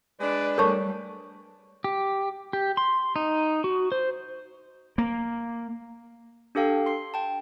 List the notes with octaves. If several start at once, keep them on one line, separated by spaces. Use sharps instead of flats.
G#3 D4 B4 D5
G3 A3 A4 A#4 C#5 A5 C#6
G4
G4
C6
D#4
F#4
C5
A#3
D4 G4 A4 F5 G5
C6 C7
G5 A5